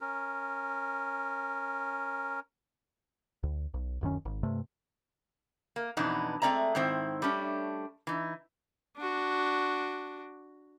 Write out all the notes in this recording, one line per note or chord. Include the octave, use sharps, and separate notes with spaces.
C#4 A#4
D2
B1
D1 F#2 D#3 C#4
G#1
G2 C3 A3
A#3
F2 B2 E3 B3 D4 D#4
G#3 A3 C4 D5 E5 A#5
G#2 D#3 C4 E4 C5
G3 A3 C#4 D4
E3 D#4
D4 F#4